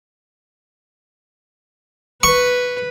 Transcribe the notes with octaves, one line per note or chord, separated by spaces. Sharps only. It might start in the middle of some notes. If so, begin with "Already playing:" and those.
B4 C#6